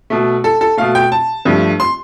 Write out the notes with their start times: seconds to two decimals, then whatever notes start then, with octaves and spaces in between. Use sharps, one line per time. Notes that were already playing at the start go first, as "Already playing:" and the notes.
0.10 B2 A3
0.44 A4
0.61 A4
0.77 B2 A3 F5
0.95 G5
1.12 A5
1.45 G2 F3 A3
1.80 C6